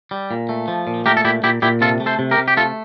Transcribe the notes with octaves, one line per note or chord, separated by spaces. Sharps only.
G3
A#2
A3
F3
A#2
A3 G4 A#4
A4
A#2 E4 G4
A#2 E4 G4
A#2 E4 G4
C3 F4 A4
A3
A4 C5
C3
G4 A#4
C3
G4
A3 F4 A4